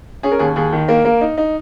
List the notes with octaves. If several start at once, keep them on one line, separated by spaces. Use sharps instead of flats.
C#4 G#4
A#4
D#2 G#4
D#2 G#4
D#3
A#3 A#4
A#3
D#4
D#4